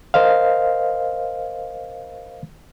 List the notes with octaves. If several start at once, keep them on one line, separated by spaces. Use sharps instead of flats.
A#4 C5 D#5 F5